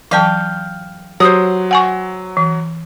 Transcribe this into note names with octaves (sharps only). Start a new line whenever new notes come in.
E3 F#3 F5 G5 A5
F#3 G4 C5 D#6
F#5 G#5 C#6
E3